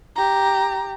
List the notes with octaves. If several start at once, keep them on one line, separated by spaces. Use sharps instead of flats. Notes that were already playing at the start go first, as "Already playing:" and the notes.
G4 A#5